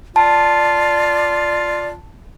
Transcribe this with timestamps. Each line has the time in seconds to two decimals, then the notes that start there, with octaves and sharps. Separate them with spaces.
0.16 F4 D5 A5